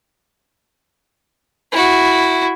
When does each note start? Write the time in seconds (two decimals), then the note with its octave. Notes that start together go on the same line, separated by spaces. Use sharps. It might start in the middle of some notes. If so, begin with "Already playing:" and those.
1.72 E4 F#4